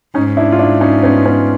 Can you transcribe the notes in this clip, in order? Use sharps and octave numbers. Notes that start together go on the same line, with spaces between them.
G#2 C#4 D#4
D4 E4
F4
D4 E4
C#4 D#4
B3 C#4
B3 C#4